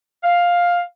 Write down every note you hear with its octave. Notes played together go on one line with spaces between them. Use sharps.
F5